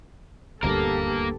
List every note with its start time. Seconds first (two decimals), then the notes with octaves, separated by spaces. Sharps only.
0.63 D#1 D2 G2 A#3 B3 G4 A4 A#4